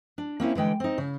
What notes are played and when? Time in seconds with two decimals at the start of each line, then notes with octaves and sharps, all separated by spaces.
0.18 D4
0.40 A#3 C4 C#4 E4
0.55 D3 E3 G#3 G5
0.80 C4 D#4
0.98 C#3